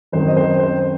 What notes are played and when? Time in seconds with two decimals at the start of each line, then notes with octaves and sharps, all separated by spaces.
0.12 F#2 D#3 F#3 C4 C5
0.28 D#5
0.37 C5
0.59 C5